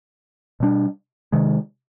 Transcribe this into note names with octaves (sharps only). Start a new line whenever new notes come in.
B2 G3 B3 D4
C3 D#3 G#3